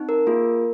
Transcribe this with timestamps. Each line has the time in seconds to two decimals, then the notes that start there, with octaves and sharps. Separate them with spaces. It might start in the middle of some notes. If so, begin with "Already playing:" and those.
Already playing: C4 D#4
0.09 A#4
0.27 A#3 F4 G#4